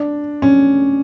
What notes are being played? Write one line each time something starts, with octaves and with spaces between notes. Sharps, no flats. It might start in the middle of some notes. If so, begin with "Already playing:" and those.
Already playing: D4
C#4